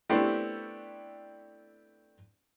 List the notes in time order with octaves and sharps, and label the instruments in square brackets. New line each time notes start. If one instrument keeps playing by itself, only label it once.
[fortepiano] A3 B3 C4 D4 E4 G4